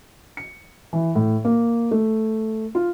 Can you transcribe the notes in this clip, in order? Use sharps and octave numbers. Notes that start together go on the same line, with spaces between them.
C#7
E3
A2
A#3
A3
F4